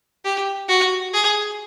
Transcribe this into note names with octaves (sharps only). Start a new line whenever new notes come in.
G4
F#4
G#4